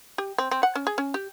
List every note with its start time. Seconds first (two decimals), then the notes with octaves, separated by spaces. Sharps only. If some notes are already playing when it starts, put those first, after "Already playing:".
0.18 G4
0.38 C4
0.51 C4
0.63 F#5
0.75 C#4
0.87 G#4
0.98 C#4
1.14 G4